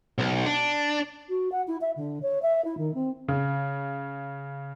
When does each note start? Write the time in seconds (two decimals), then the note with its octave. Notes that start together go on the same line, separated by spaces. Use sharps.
0.18 B1
0.46 D4
1.29 F#4
1.52 F#5
1.67 E4
1.81 E5
1.96 D3
2.22 C#5
2.42 E5
2.64 E4
2.77 D#3
2.94 C4
3.28 C#3